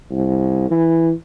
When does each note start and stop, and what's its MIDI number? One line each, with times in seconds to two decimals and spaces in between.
0.11 0.70 36
0.71 1.12 52